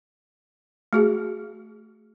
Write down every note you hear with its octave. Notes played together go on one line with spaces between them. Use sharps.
A3 F#4 G#4